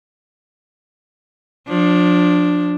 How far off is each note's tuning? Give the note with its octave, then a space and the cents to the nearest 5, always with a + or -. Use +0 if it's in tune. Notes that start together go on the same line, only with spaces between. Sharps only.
F3 +30 D4 +0